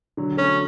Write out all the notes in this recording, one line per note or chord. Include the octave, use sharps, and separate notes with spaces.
D3 F#3
F#3 A3 C#4